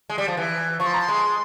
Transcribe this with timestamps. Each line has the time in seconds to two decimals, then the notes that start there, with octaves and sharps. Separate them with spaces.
0.10 G#3
0.18 G3
0.28 F3
0.37 E3
0.80 F3 C#6
0.87 C6
0.94 A#5
1.01 C6
1.08 G#3